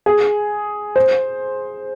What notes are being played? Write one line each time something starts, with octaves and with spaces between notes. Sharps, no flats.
G#4
C5